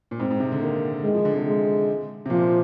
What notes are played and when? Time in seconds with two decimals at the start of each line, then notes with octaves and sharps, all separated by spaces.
0.11 A#2
0.19 G#2 C4
0.30 G#2
0.40 C3
0.52 D3
0.61 D#3 A#3
1.04 D#3 G#3
1.14 F3
1.25 D3
1.36 C3
1.46 G#3
2.26 C3
2.30 A#2 F3